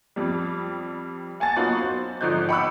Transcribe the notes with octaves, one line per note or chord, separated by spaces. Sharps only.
F2 G3
F#5 G#5 A5 A6
F#3 A#3 B3 D#4 F4 F#4
C5
G#1 D3 F3 D#4 F#6 G6
F#5 G5 B5 C#6 D6 E6